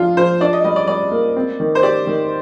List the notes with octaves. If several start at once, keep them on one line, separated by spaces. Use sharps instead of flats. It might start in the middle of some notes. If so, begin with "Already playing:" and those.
Already playing: F3 D4 F4
F3 C5
D4 D5
D#5
G3 D#5
D5
G3 D5
A#3
C4
D#3
C5
G4 D5
D#3